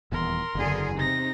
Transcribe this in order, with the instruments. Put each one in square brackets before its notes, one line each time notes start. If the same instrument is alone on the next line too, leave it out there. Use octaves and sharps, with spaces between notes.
[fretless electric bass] D#1 E2 [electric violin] A#4 C6
[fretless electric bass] F#1 [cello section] E2 D3 G#4
[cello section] C3 [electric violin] D#4 A#6